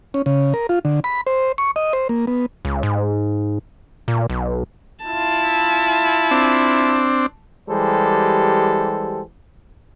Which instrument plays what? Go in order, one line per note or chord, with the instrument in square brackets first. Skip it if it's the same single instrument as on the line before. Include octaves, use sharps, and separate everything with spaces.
[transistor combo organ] C#4
C#3
A#4
F4
D3
B5
C5
C#6
D#5
C5
A#3
B3
[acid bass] C#2
G#2
A#2
B1
[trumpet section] E4 F4 [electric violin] A5
[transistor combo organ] C4 D4
[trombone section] E3 G3 G#3 G4 A4 C5